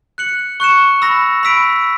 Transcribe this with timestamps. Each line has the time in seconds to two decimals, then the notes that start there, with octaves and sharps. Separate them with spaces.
0.18 F#6 C#7 F#7
0.60 C#6 F#6 C#7 E7
1.02 B5 E6 A#6
1.43 B5 E6 B6 D7